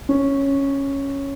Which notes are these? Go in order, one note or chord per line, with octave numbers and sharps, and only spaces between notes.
C#4